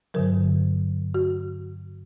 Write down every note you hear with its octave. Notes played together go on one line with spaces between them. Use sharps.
G2 D3 F#3 A#4
F#4